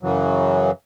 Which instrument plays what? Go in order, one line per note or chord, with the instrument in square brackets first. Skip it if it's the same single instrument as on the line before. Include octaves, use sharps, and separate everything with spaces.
[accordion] F#2 C#3 E3 F#3